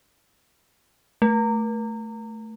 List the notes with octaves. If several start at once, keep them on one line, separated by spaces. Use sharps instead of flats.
A3